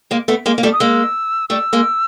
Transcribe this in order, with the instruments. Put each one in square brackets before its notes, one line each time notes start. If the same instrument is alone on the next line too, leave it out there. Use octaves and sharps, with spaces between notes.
[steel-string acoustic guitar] G#3 A#3
A3 B3
G#3 A#3
A#3
G3 A3
[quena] D#6
[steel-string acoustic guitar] G#3 A#3 [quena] E6
[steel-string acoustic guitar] G3 A3 [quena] E6
[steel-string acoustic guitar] G#3 A#3